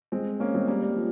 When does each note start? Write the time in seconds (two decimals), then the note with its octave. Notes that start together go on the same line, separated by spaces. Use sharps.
0.12 G#3 C4
0.40 A#3 C#4
0.54 G#3 C4
0.68 G3 A#3
0.82 G3
0.96 F3